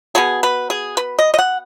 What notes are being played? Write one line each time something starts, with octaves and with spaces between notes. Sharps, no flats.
B2 B3 G#4
B4
G#4
B4
D#5
D#5
F#5